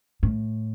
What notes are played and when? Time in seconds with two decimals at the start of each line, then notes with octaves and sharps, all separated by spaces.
0.23 A2